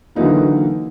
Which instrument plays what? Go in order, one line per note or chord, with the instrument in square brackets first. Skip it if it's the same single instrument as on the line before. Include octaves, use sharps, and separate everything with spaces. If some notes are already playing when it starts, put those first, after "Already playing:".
[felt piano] D3 E3 F#3 A#3 D#4 E4